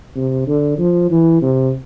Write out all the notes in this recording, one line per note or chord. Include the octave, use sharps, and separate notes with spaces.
C3
D3
F3
E3
C3